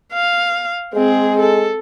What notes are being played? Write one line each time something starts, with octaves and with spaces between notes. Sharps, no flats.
F5
G#3 C4 G#4
A4